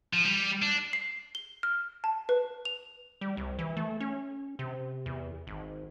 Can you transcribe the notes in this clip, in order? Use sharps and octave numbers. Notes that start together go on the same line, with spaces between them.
F3
G3
D4
C7
G7
F6
A5
B4
F7
G3
C2
E3
A3
C#4
C3
E2
G#1